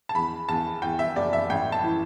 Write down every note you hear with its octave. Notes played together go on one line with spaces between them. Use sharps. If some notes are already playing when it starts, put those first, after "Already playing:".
A5
E2 B5
E2 A5
E2 G5
E5
F#1 D5
E5
A1 G5
A5
E3